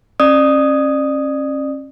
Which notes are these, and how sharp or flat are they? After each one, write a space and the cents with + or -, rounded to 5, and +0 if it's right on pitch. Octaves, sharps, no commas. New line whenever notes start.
C#4 -35 D5 +35 D#6 +0